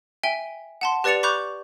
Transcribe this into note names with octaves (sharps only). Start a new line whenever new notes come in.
E5 G5 G#5 G7
F#5 A5 C6
G4 B4 D5 A6 C#7 F7
B5 C#6 D6 F#6 G6 F7